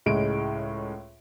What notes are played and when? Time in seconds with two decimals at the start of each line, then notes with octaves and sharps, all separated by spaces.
0.06 C#2 A2 G#3 D7